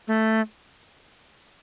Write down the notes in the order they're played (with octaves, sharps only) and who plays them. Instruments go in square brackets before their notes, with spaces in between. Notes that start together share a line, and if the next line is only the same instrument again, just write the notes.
[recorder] A3